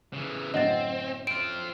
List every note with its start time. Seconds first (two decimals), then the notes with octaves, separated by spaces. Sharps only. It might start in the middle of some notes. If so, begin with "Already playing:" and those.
0.13 C#3 E3
0.54 F#2 A2 D3 C4 D#5 F#5 A6
1.27 C4 F4 D7